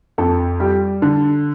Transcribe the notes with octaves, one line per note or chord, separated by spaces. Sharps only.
F2 A4
G3 G4
D3 A4